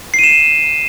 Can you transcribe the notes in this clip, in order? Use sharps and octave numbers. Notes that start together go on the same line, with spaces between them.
C7 D#7 E7